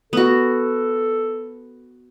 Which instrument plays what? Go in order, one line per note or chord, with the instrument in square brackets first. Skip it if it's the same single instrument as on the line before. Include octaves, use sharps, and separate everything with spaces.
[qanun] B3 F#4 [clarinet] A4